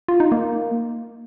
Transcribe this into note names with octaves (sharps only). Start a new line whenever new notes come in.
F4
D#4
A#3